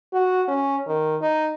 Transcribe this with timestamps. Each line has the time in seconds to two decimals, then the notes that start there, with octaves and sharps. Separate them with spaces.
0.13 F#4
0.48 C#4
0.87 D#3
1.21 D#4